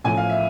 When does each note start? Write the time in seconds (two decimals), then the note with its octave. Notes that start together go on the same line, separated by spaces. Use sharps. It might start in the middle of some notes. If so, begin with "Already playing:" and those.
0.05 A1 A2 F3 G#5
0.17 F5
0.30 E5